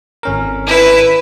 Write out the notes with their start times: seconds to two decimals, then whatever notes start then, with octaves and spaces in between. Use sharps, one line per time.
0.23 G#1 C#4 A#4
0.68 E4 B4